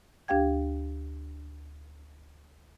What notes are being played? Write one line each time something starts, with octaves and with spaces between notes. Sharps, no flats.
D2 D4 G4 F5 G5 G#6